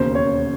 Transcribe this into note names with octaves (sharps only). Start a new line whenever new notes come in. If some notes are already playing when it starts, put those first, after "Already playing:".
Already playing: E1 D#2 C#3 C5
C#5